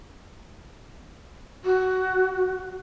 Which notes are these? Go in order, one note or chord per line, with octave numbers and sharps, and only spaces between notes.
F#4